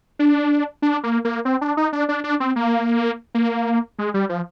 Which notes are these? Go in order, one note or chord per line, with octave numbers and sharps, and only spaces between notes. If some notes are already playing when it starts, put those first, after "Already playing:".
D4
D4
A#3
A#3
C4
D4
D#4
D4
D4
D4
C4
A#3
A#3
G#3
G3
F3